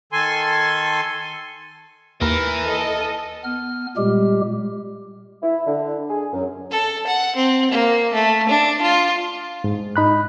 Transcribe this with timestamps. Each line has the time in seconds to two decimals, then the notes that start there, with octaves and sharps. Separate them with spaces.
0.13 D#3 A4 G#5 C6
2.21 D#2 E3 A#4
2.64 A4 D#5
3.44 B3 F6
3.97 A#2 G3 G#3 G4
5.43 E4
5.66 D3
6.10 G#4
6.33 F#2
6.71 A4
7.07 F#5
7.36 C4
7.71 A#3
8.13 A3
8.49 D4
8.82 F4
9.64 G#2
9.96 D#4 B5 F#6